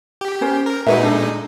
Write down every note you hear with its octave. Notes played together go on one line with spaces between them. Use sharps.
G4
C#4 C5
A#4
A#2 G#3 D#4 F#4 B4 E5
D4 A4